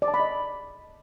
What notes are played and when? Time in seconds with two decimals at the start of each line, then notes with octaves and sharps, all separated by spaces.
0.02 D5
0.08 A5
0.14 B5
0.20 D#5